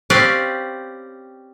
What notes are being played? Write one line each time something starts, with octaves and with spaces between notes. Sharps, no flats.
C4 C#4 G4 B4 D5 F5